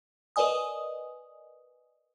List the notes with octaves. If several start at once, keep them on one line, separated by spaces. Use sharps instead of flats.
A#4 B4 D5 D#5 G#5 D#6